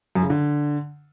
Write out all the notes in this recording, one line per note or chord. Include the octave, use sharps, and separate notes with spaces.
F#2
C#3
D3